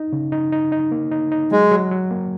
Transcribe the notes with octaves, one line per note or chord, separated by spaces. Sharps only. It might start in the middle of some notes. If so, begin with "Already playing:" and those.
Already playing: D#4
C#3
D#4
D#4
D#4
A#3
D#4
D#4
F#3 G#3
F#3
F#3
A#3